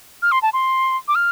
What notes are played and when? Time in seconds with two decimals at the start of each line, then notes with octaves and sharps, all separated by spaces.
0.22 F6
0.32 C6
0.42 A5
0.53 C6
1.08 D6
1.15 F6